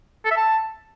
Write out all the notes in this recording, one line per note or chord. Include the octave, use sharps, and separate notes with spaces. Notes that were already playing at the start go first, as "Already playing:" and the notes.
A4
E5
A5